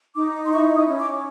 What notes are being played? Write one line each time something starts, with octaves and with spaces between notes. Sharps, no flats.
D#4 D6
C6
E4 C#6
D#6
C#4
D6